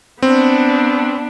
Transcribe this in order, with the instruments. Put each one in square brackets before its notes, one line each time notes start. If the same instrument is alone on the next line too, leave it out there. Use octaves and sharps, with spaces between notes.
[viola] B3 D4 [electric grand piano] C4